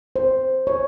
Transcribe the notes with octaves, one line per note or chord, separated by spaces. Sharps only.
C5
C#5